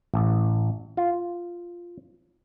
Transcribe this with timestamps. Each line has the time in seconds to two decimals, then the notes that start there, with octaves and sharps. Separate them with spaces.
0.14 A1
0.97 F4